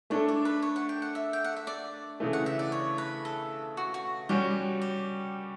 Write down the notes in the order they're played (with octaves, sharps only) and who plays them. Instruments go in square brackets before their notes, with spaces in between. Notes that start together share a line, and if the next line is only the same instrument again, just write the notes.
[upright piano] A3 D4 A4 [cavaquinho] C#5
[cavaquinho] D5
B4
C#5
F#5
G5
F#5
E5
G5
F#5
E5
D5
[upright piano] C#3 E3 A3
[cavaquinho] F#5
E5
D5
C#5
B4
A4
F#4
F#4
[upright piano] G3 C#4 F#4 C#5 [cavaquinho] G4
[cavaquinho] G4